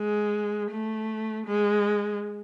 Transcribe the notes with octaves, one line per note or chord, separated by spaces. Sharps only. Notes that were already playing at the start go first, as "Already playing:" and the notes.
Already playing: G#3
A3
G#3